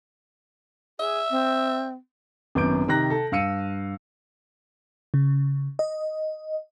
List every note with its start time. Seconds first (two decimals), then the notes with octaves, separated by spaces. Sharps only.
0.99 G#4 E5
1.31 C4
2.55 G#1 F#2 B3 D6 G6 D7
2.88 C3 D#3 A#5 F#6 A#6
3.10 A4
3.32 G2 F5 E6 C#7 D#7
5.14 C#3
5.79 D#5